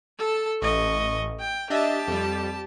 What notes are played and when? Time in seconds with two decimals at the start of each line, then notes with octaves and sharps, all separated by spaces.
0.19 A4 A5
0.62 A1 D#5 C#6
1.40 G5
1.70 D4 G4 D#5 E5 A5
2.07 F2 G3